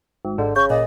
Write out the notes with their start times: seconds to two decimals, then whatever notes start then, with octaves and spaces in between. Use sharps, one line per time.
0.25 G#1
0.38 G#1 G#2 D3
0.56 C#3 C#6 G6
0.70 A#2 D#5